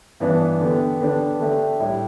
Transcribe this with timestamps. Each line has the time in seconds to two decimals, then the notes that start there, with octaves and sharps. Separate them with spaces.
0.20 G2 E3 B3 D4
0.60 D3 B3 G4
1.00 D3 B3 D4 G4
1.40 D3 A3 D4 G4
1.80 A2 G3 E4 G4